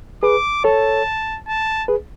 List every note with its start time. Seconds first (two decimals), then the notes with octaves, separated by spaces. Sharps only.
0.23 G#4 B4 D6
0.64 A4 C#5 A5
1.48 A5
1.88 G#4 B4